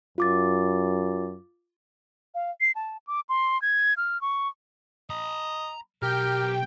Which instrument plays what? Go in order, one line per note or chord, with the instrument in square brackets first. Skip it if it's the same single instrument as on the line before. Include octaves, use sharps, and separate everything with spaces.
[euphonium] F#2 [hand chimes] F4 D6 A6
[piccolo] F5
C7
A5
D6
C6
G#6
F6
C#6
[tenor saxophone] D#5 [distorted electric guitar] A#5 B5
[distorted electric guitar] B1 [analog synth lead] G4 [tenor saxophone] A#4 [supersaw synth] G5